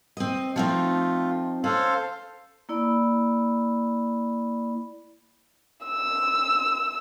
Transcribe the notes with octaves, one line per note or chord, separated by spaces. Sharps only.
C4 D#5
F3 A3 C4 D#4 F4
C#4 A4 C5 F5
A#3 E4 D5 B5
E6